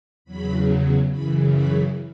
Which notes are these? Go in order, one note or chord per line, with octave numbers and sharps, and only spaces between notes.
E2 C#3 F#3 B5
F#2 C#3 E3 B5
B5